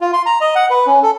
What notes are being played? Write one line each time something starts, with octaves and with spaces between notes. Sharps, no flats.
F4
C6
A#5
D#5
F#5
B4
C#4
A4